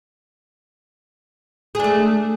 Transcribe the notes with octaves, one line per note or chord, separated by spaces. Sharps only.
A3 D4 G#4